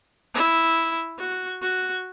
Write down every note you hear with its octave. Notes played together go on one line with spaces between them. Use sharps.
E4
F#4
F#4